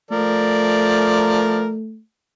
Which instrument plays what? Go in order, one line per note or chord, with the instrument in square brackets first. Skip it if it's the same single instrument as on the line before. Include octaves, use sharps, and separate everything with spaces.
[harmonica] F3 A#4 D5 [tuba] A3